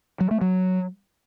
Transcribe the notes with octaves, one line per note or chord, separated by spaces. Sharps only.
F#3
A3
F#3